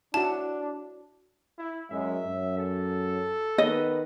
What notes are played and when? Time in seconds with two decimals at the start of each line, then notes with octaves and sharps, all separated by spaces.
0.14 D4 E4 F#4 A5
1.58 E4
1.91 F#2 G#3 E5
2.26 F#2
2.58 A4
3.58 D#3 B3 B4 D#5